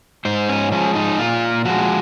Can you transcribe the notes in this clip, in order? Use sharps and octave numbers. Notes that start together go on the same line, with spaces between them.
G#2 C5
C#4
F3 G#3 C#4
D#4
A#2 F4
F3 G#3 F#4